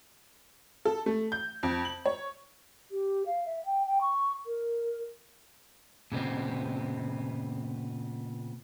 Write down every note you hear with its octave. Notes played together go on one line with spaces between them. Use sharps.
A4
A3
G6
F2
F#7
C#5
G4
F5
E5
G5
G5
C#6
A#4
A#2 C#3 B3 C4